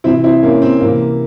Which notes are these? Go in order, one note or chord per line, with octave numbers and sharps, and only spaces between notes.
C3 E3 C4 E4
C4 E4
A#3 C#4
C4
C3 E3 A#3